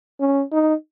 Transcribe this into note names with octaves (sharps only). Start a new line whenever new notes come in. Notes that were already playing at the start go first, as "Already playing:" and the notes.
C#4
D#4